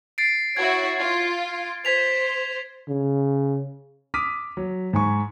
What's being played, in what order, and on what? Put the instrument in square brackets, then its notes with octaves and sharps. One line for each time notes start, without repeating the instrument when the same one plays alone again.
[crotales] A6 C7 D7
[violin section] E4 F#4 C#5 [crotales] G#6
[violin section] F4
[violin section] C5 [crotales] G#6 B6 F7
[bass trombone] C#3
[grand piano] D6 D#6 F6 B6 D#7
F#3
G#2 G#5 C#6